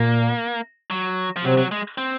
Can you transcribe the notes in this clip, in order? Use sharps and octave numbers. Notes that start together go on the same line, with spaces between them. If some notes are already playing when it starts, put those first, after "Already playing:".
Already playing: A#2 A#3
F#3
F3
C3 F#3
F#3
G#3
C4